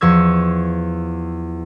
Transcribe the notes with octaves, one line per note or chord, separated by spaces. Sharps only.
E2 F3 C#6 E6 G#6